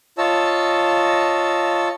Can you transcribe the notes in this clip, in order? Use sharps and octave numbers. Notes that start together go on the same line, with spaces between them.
F4 C#5 D#5 A5 E6